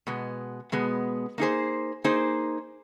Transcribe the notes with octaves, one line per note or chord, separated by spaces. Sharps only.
B2 G#3 B3
B2 G#3 B3
A#3 D#4 G#4 C5
A#3 D#4 G#4 C5